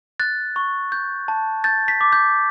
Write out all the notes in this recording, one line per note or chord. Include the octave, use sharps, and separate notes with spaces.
F#6 A6
C#6
G6
A5
G6 A6
B6
D6
G6